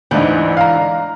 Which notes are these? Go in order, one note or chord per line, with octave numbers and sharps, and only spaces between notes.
D2 G#2 D3 E3
F5 A#5